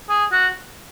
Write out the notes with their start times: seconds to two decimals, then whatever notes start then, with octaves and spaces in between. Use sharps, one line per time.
0.09 G#4
0.32 F#4